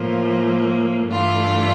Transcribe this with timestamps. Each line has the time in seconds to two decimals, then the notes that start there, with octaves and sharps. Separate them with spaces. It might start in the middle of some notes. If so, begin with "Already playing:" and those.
Already playing: A2 F3 A#3
1.07 G2 E3 A3 D4 F4